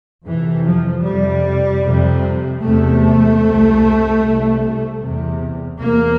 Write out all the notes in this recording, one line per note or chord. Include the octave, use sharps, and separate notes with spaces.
F2 C3 E3
F3
F2 C3 G3
F2 C3
E2 C3 A3
C2 C3
C2 C3
E2 C3
E2 C3 A#3